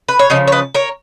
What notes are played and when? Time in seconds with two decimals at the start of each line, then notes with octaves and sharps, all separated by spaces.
0.08 B4
0.19 C#5
0.30 C#3 F3 D#5
0.48 C#5
0.52 B4 D#5
0.75 A#4 C#5